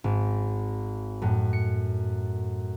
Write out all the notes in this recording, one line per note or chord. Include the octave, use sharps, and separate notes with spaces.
G#1
F#2 A2
C#7